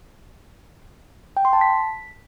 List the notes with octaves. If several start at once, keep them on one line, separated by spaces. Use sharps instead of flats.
G5
C6
A5
B6